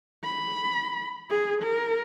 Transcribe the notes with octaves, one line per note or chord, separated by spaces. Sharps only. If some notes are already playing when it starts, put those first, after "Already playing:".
B5
G#4
A#4